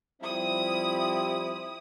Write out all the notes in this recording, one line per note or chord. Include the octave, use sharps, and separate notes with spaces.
F3 G3 C4 E4 D#6